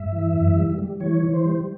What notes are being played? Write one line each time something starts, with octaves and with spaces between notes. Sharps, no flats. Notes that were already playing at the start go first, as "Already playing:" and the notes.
Already playing: G2 E5
E3
F#2
G3
G3
E3 C#5
E3
C5
G3